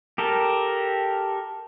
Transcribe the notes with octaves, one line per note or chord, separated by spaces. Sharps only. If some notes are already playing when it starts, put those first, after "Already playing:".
G4 A4 A#4